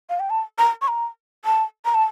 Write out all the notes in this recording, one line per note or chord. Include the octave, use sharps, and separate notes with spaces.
F5
G5
A5
A#5
C#6
A#5
A5
A#5
A5